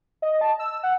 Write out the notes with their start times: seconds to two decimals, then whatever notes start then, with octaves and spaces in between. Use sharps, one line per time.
0.22 D#5
0.41 A5
0.59 E6
0.83 F#5